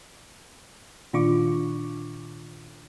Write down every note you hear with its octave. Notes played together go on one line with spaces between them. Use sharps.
A#2 D#3 D4 F4 C#6 D6